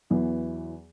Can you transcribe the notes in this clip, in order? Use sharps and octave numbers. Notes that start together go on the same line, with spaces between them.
E2 E3 F#3 B3